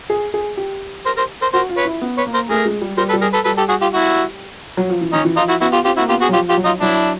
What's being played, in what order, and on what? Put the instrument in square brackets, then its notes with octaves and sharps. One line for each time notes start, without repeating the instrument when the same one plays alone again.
[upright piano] G#4
G#4
G4
[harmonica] A#4 C5
A#4 C5
A#4 C5
[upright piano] F#4 [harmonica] A#4 C5
[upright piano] F4
[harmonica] B4 C#5
[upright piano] E4
B3
[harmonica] B4 C#5
[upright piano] A#3
[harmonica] A#4 C5
[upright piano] A3 [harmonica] G#4 A#4
[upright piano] G#3
G3
[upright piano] G3 [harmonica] A#4 C5
[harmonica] A4 B4
[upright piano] G3
[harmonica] G#4 A#4
A4 B4
[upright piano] G3 [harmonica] A4 B4
[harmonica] G4 A4
F#4 G#4
F4 G4
E4 F#4
[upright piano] F#3
F3
E3
[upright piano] D#3 [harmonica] C#4 D#4
[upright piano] E3
[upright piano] F3 [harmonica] D#4 F4
[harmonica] E4 F#4
[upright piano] B3 [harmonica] E4 F#4
[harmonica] F4 G4
[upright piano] C4 [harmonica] F4 G4
[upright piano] A#3 [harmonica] E4 F#4
[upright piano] B3 [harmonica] F4 G4
[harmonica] F#4 G#4
[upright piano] F#3
[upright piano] F3 [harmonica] F4 G4
[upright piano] F3 [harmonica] F4 G4
[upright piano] F#3
[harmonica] D#4 F4
[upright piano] F#3 [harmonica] D4 E4